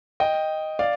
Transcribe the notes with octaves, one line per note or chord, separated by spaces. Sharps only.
D#5 G5
D5 F5